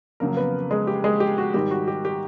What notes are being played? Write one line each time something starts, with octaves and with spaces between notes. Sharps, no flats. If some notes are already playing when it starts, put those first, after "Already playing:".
F2 C#3 F#3 A#3 A#4
B3 B4
G#3 G#4
G4
G#3 G#4
G4
F#4
G#2 D#3 G3 G4
F#4
G4
G4